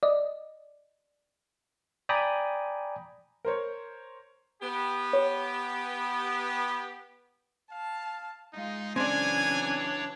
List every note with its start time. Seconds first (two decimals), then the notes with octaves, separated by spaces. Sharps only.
0.03 D5 D#5
2.09 D5 G5 G#5 A#5 B5 D#6
3.45 A#4 C5 C#5
4.61 B3 G4
5.13 C#5
7.72 F5 A5
8.53 G#3 D#4 F4
8.96 C#3 E3 F#3 C4 D4 C#5 D5 G#5